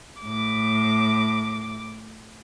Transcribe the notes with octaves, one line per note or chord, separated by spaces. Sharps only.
A2 D6